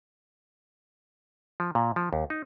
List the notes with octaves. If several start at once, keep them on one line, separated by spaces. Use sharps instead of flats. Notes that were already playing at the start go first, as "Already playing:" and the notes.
F3
A#2
F3
D#2
D#4